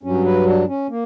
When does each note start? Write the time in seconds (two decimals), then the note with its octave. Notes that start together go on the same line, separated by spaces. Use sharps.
0.03 G2 F#3 C#4
0.25 B4
0.46 D4
0.68 C#4
0.90 A#3